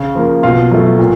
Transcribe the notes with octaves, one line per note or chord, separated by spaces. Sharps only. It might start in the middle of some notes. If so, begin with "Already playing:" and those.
Already playing: C#3
F3 A#3
B2 F4 F5
F#3 A3
A#2